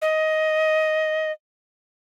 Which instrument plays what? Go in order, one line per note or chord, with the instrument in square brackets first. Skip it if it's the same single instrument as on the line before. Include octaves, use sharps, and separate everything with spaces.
[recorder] D#5